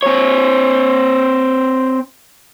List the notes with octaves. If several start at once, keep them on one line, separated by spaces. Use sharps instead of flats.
C4 C#5